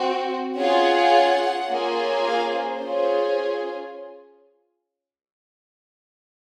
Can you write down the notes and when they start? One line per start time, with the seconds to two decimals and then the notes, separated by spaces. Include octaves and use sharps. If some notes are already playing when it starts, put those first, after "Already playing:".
Already playing: C4 F#4
0.57 C#4 F4 G#4 F#5
1.70 A#3 C#4 F4 G#4
2.26 F5
2.54 C5
2.82 C#4 F4 G#4